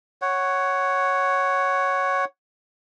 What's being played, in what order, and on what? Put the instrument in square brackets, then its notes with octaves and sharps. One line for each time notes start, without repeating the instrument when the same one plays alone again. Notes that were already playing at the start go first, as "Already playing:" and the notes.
[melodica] C#5 F#5